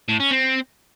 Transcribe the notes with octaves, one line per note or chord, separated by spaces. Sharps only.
A2
C#4
C4